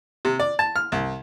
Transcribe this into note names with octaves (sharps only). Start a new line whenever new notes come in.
C3
D5
A5
F6
C2